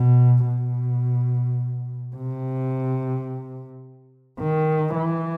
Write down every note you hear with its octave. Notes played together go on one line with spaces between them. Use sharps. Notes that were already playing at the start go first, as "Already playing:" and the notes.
Already playing: B2
B2
C3
D#3
E3